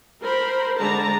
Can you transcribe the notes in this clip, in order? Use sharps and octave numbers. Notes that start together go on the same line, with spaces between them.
A#4 C5 B5
D3 G#3 A5 A#5